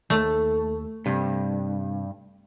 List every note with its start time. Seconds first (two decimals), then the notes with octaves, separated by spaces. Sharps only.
0.10 D#2 A3 A4
1.06 G2 C3